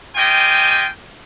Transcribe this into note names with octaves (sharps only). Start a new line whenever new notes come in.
F4 G4 D#5 G5 G#5